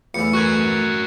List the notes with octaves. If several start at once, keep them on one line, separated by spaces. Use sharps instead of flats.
E2 E3 A3 C#7
F#4 A#4 C#6 F#6 G#6